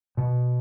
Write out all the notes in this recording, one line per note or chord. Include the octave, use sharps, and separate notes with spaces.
B2